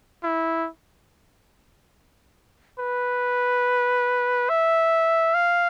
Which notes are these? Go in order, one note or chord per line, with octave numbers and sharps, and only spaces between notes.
E4
B4
E5
F5